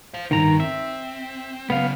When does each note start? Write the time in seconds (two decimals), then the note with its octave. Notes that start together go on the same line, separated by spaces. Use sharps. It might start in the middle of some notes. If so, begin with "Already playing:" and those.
0.14 C5 F5
0.31 C2 G2 D#3 A#5
0.60 C4 E5
1.70 C#3 F#3 B3 F5